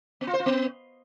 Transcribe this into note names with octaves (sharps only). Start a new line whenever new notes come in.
B3
F4
C5
F4
B3